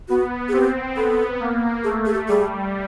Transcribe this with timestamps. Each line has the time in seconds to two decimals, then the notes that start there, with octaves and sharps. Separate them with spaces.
0.09 B3 F#4
0.48 G#4
0.53 C4 G4
0.96 B3 A4
1.40 A#3
1.84 A3 G#4
2.06 G#4
2.14 G4
2.29 G3 G#4